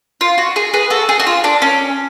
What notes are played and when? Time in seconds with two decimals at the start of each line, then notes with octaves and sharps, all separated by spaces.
0.21 F4
0.38 F#4
0.56 G#4
0.74 G#4 B4
0.90 F#4 A4
1.09 G#4
1.20 F#4
1.27 F4
1.44 D4
1.62 C#4